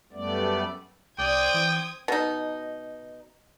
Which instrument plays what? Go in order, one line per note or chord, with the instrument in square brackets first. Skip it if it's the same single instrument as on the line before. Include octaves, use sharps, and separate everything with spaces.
[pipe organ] F#2 G3 A3 B3 D5
[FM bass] C2 [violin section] C4 D#6 G#6 [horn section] D5 [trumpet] G5
[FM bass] E3
[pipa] B2 D#4